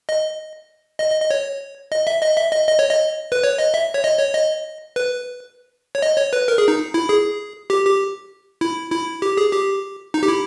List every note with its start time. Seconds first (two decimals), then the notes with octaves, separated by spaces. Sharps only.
0.09 D#5
1.00 D#5
1.10 D#5
1.20 D#5
1.31 C#5
1.92 D#5
2.07 E5
2.22 D#5
2.37 E5
2.52 D#5
2.68 D#5
2.79 C#5
2.91 D#5
3.32 B4
3.44 C#5
3.59 D#5
3.74 E5
3.94 C#5
4.04 D#5
4.19 C#5
4.35 D#5
4.96 B4
5.95 C#5
6.02 D#5
6.18 C#5
6.33 B4
6.48 A#4
6.58 G#4
6.68 D#4
6.94 E4
7.09 G#4
7.70 G4
7.86 G4
8.61 E4
8.92 E4
9.22 G4
9.37 G#4
9.53 G4
10.14 D#4
10.23 G4
10.28 E4